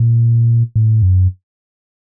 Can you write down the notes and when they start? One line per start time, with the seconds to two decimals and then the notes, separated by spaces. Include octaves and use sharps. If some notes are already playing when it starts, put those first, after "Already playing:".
Already playing: A#2
0.76 A2
1.02 F#2